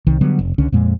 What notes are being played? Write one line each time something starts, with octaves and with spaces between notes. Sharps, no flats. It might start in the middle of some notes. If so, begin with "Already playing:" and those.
C2 D#3
D3 F#3 G3 B3
F1
C#2 D3 C#4
F2 A#2 G#3